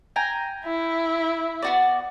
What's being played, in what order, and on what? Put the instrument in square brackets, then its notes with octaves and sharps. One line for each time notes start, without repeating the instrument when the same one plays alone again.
[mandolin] G5 G#5 A#5
[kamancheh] E4
[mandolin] B3 F#4 D5